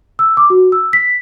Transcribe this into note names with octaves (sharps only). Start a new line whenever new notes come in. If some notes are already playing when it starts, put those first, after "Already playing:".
E6
D6
F#4
E6
B6